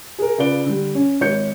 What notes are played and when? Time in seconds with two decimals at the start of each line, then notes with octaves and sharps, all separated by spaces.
0.18 G#4 A#4
0.38 C#3 F4 B4 D5 D7 G7
0.66 D3 G3
0.95 C#4
1.21 G#1 C#5 G6 C#7